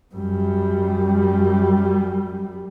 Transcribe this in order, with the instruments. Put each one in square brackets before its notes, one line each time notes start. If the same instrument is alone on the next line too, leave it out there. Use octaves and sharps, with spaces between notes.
[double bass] F#2 G3